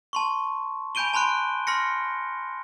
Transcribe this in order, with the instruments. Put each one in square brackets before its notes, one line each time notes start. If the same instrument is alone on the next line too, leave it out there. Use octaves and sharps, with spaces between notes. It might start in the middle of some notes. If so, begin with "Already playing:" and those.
[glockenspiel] A5 C6 C#6
G#5 B5 G6 D7 D#7 G7
A5 B5 C6 F#6 D7
C6 F6 A#6 C#7